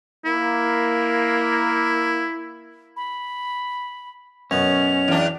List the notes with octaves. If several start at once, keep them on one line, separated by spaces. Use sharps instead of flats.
A#3 E4
B5
F#2 B2 C#4 F7
E2 D4